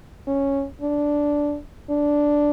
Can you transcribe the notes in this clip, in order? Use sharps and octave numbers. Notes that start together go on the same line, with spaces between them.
C#4
D4
D4